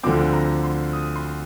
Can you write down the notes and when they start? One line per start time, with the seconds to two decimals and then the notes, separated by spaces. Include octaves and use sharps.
0.03 D2 D3 F3 C4 D6
0.33 A#5
0.64 C6
0.93 D#6
1.16 C6